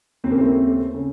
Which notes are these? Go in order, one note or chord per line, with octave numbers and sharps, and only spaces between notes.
D#2 C#3 C4
A#3
A3 C4
C#3